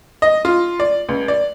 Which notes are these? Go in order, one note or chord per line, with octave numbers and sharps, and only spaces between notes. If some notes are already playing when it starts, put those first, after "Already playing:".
D#5
F4
D5
C#2
D5